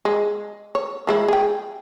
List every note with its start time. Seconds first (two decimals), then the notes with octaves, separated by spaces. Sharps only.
0.05 G#3
0.75 C#5
1.07 F3 G#3 E4
1.28 G#4 G5